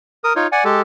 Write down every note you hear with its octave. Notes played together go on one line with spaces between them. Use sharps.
A#4 D#6
D#4 F4 C#5
D5 F#5 G#5
G#3 G4 A4